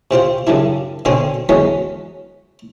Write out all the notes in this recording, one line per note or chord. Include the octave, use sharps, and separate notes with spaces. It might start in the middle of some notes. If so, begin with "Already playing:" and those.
C3 C4 F4 C5
F#2 C#3 G3 D4 E4
B2 D3 C4 C#4 G#5 C6
E3 F#3 G#3 B3 C#4